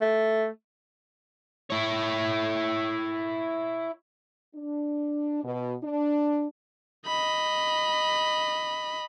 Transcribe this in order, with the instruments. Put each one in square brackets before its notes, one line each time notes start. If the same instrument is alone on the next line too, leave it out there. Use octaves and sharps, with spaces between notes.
[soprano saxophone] A3
[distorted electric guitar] E4 C#5
[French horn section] D4
B2
D4
[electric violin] D#5 B5